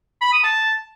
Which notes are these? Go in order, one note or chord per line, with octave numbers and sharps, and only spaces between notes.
B5
D#6
A5